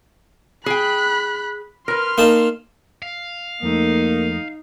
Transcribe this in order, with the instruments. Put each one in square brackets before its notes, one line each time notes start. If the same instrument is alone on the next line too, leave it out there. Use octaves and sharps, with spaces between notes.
[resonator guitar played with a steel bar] G#4 G5 [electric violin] B5 F#6
[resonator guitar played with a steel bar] A#4 B4 [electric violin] C6 F6
[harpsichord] A#3 D#4 A5
[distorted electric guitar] F5
[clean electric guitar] F2 A3 [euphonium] A#3 [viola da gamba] D#4